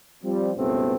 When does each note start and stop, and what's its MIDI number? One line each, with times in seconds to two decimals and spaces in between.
0.23 0.51 53
0.23 0.51 55
0.23 0.51 60
0.56 0.95 37
0.56 0.95 43
0.56 0.95 47
0.56 0.95 57
0.56 0.95 59
0.56 0.95 60